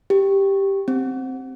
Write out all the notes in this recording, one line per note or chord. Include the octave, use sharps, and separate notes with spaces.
G4
C4